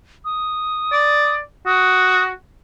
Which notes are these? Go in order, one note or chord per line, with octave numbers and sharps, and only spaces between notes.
D#6
D5
F#4 D#6